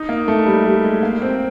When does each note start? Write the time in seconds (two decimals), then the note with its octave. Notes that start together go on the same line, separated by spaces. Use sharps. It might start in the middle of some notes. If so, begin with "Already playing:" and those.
Already playing: D#4
0.09 A#3
0.28 A3
0.46 G3
0.65 G3
0.84 G#3
1.03 A#3
1.22 C4